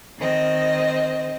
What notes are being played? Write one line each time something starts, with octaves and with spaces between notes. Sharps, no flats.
D#3 C4 D#5